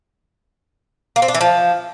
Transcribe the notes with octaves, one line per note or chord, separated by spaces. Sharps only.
A#3
C4
D4
E3
F3